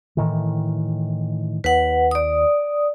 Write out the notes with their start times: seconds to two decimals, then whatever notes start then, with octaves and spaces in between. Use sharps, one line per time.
0.17 A2 D#3 E3
1.64 D#2 B4 F#5
2.11 D5 D#6